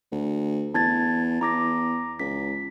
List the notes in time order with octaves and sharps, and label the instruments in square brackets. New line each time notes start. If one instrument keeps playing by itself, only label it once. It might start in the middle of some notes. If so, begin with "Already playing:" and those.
[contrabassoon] D2
[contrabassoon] E2 [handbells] A5 G#6 A6
[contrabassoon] E2 [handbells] A#5 D6 A#6
[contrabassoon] C#2 [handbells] B6